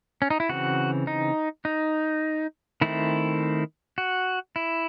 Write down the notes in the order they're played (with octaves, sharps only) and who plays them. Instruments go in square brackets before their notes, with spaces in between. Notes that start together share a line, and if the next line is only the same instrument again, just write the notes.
[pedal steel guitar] C#4
D#4
E4
C#3 E3 C4 F#4
D#4
D#4
D#3 A3 C4 E4
F#4
E4